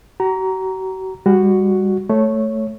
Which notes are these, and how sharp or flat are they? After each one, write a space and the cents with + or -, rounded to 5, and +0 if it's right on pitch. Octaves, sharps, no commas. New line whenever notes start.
F#4 +40 A#5 +0
G3 +30 F#4 +0
A3 +0 C#5 +0